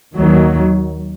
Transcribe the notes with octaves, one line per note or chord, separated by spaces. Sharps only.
D#2 D#3 F#3